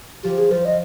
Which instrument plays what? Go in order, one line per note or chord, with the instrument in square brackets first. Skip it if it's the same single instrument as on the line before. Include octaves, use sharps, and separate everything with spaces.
[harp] F3 [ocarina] G4
[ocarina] G#4
[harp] F3 [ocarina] C5
[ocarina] D#5